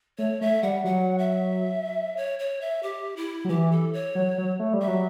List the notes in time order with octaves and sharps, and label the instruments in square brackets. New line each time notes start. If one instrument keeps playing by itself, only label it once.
[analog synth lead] A3 [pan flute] C#5
[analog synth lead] A3 [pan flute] E5
[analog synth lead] G3 [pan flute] F#5
[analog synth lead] F#3 [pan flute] F#5
[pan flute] E5
C#5
C#5
E5
G4
E4
[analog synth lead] F#3
[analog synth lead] E3 [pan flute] G4
[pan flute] A4
C#5
[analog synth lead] F#3
F#3
A3
G3
[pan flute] E5
[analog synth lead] F#3